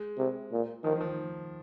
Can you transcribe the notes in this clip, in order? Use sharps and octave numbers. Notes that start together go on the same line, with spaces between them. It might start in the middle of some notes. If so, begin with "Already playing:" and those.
Already playing: G#3
C3
A#2
D#3 F3
D#3
F3